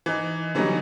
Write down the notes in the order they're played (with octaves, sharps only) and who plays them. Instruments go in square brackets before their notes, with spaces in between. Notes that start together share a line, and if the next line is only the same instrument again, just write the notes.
[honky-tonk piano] E3 D#4
D3 E3 F#3 G3 C#4 D#4